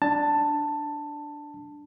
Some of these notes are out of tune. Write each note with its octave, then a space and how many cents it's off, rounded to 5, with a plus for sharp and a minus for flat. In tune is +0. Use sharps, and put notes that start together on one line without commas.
D4 +0 A5 +10